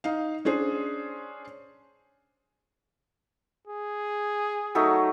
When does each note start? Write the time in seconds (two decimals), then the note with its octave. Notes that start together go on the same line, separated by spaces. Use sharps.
0.04 D#4 F5
0.45 C#4 D4 G#4 C5
3.68 G#4
4.75 F#3 A3 D#4